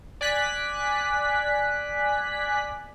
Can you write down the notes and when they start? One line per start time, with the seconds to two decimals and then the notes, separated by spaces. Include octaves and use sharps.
0.21 D5 G#5 F#6 B6